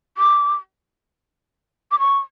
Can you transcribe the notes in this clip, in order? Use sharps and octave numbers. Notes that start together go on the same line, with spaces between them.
D6
D6
C#6